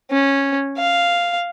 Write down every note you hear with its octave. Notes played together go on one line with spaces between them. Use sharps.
C#4
F5